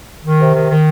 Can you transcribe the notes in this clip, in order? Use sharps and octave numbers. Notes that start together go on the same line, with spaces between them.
D#3
C3
D#3
D#3